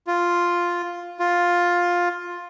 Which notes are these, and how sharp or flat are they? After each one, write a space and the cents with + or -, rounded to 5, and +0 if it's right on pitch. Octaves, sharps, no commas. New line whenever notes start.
F4 +0
F4 +10